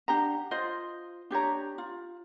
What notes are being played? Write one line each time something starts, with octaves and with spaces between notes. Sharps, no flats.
D4 G4 F#5 A#5
F4 C5 D#5
D4 G4 C#5 A#5
F4